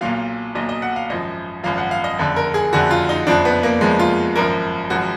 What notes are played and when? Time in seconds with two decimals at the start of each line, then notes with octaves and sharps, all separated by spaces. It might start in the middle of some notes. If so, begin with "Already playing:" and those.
0.01 B1 A#2 F#3 F5
0.55 B1 A#2 F#3 D#5
0.69 D#5
0.82 F#5
0.96 F5
1.10 G#1 F#2 F3 D#5
1.64 G#1 F#2 F3 F5
1.78 F#5
1.91 F5
2.04 D#5
2.18 F#1 F2 D3
2.36 A#4
2.54 G#4
2.73 F#1 F2 D3 F#4
2.91 F4
3.09 D#4
3.27 F#1 F2 F3 D4
3.45 B3
3.63 A#3
3.81 F#1 F2 F3 G#3
3.99 F4
4.36 G#1 F#2 F3 A#4
4.90 G#1 F#2 F3 F#4